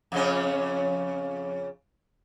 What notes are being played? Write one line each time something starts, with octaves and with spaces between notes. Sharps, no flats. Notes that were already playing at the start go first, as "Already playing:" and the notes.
F2 C#3 C#4